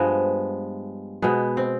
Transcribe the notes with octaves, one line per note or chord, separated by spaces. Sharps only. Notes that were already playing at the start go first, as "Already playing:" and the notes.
Already playing: G2 F3 G#3 B3
B2 G#3 B3
C4